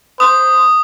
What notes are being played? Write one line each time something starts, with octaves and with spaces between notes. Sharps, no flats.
C5 D#6